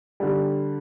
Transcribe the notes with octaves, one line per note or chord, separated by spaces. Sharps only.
D3 G3